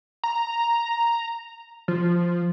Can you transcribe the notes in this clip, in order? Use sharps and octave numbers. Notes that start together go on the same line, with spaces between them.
A#5
F3